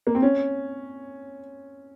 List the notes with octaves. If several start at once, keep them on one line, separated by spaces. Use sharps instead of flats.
A#3
C4
C#4